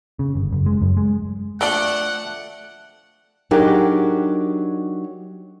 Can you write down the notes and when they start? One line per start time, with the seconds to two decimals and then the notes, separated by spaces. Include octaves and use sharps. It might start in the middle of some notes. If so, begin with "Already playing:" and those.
0.19 C#3
0.35 G1
0.52 F#1
0.66 G#3
0.82 F#2
0.97 G#3
1.61 F3 A3 D4 D5 F#5 G5
3.51 F#3 D4 D#4 G4 G#4 A#4